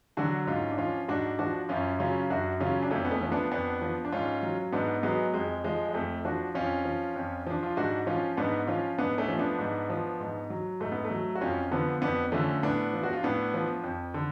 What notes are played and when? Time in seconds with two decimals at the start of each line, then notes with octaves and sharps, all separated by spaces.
0.17 D3 F#3 D4 F#4
0.47 G#2 C#4 F4
0.71 D4
0.78 F3 C#4 F4
1.08 G#2 D4 F#4
1.39 F3 D4 F#4
1.69 F#2 C#4 F4
1.99 C#3 F#3 C#4 F4
2.30 F#2 D4 F#4
2.60 C#3 F#3 C#4 F4
2.83 D4
2.91 F2 A3 C#4
3.05 B3
3.11 A3 C#4
3.21 F3
3.32 B3 D4
3.51 F2 B3 D4
3.81 F3
4.05 D4
4.12 G#2 C#4 F4
4.43 F#3
4.72 G#2 B3 D4
5.03 F#3 G#3 B3
5.34 F2 G#3
5.64 F3 G#3
5.89 G#3
5.94 F2 A3
6.25 F3 D4 F#4
6.55 F2 C#4 F4
6.85 F3
7.16 F2
7.47 F3 D4
7.63 F4
7.77 G#2 D4 F#4
8.07 F3 C#4 F4
8.37 G#2 B3 D4
8.67 F3 C#4 F4
8.98 G#2 B3 D4
9.18 A3 C#4
9.28 F3
9.39 B3 D4
9.59 G#2
9.90 F3
10.20 G#2
10.50 F#3
10.80 G#2 A3
10.92 B3
11.05 A3
11.11 F#3
11.35 F#4
11.41 F2 C#4 F4
11.71 D3 F3 B3 D4
12.01 F2 B3 D4
12.32 D3 F3 A3 C#4
12.63 A2 B3 D4
12.93 F3
13.03 F#4
13.13 F4
13.23 A2 B3 D4
13.54 F3
13.84 F2
14.14 D3